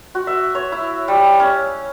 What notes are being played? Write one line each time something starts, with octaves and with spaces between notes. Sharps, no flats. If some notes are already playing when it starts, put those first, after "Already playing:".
F#4
E5
C#5
E4
G3
C#4